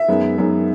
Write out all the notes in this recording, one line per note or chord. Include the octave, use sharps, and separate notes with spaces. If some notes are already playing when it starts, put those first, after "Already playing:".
Already playing: E5
F#2 D#3 G#3 B3
F#2 D#3 G#3 B3